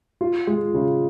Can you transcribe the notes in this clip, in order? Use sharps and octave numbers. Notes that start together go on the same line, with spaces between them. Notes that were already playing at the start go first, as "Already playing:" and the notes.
F4
G#3
C#3